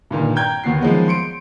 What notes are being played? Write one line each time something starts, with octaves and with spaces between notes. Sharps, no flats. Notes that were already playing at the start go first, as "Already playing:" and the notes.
G2 A#2 D#3
G5 A#5 G6 G#6
D#2 B3 F#4 C7
D#3 F3 F#3 G#3 B3
C6 C#7 D7